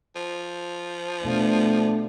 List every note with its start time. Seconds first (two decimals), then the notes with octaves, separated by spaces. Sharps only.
0.16 F3
1.25 B2 A3 B3 D4 F5